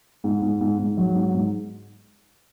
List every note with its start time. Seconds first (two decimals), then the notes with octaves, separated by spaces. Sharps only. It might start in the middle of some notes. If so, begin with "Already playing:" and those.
0.24 G#2
0.42 G#2
0.61 G#2
0.78 G#2
0.97 F#3
1.15 G#2
1.34 G#2